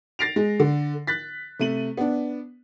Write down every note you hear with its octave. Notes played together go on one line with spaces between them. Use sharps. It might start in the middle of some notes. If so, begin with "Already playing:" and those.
A6 A#6 C7 D7 F7
G#3
D3
F#6 A6 B6
C3 A3 D#7 F#7
B3 D4